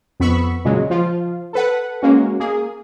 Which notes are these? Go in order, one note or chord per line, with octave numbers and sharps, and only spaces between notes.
F2 B3 B5 C#6 E6
A#2 C#3 F#3 G#3
F3 F4
A4 B4 F#5
G#3 A#3 C#4 F#4
A#3 G#4